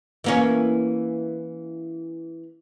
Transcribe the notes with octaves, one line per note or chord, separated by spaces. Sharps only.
E3 A#3 C#4